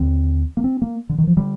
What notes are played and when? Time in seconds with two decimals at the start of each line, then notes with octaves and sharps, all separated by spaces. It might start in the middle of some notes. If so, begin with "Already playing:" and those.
Already playing: D#2 D3 C4
0.57 A#3
0.64 C4
0.82 A#3
1.09 D3
1.18 D#3
1.27 F3
1.37 D3 G3